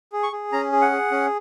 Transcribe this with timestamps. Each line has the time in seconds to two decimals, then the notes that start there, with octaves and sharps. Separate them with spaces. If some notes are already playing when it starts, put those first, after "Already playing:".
0.13 G#4
0.23 C#6
0.32 G#4
0.52 C#4 A#5
0.72 G#4
0.82 F#5
0.92 G#4
1.11 C#4